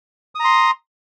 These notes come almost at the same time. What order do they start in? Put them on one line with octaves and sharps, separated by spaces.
D#6 A#5 C6